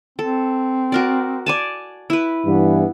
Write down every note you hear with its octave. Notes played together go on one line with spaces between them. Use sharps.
C4 A4
F#4 A#4 D5
D5 G#5 A5
E4 B4
G2 E3 B3